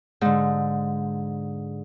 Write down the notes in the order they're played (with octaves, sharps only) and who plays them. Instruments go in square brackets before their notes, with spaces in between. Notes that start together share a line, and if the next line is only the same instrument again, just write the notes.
[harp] G#2 D3